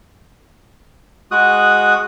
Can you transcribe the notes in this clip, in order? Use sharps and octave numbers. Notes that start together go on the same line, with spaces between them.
G#3 F#4 D#6 F#6